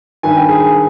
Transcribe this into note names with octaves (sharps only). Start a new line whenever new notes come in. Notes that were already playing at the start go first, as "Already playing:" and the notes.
G#1 G2 D#3 G#5
G5
G#4 G#5